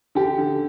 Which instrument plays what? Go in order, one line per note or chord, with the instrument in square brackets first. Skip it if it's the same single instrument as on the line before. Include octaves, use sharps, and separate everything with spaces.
[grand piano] D3 G4
D3